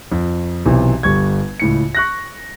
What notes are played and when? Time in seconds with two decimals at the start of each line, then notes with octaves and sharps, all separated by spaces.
0.12 F2
0.66 B1 C3 E3
1.03 G1 G3 C#6 G#6
1.60 C#2 A2 C#7
1.95 C#6 F#6 A#6